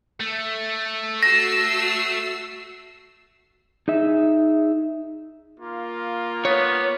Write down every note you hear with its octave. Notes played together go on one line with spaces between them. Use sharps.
A3
F#4 E6 A#6 C7
D#4 G#4 E5
A#3 F4
B3 C#5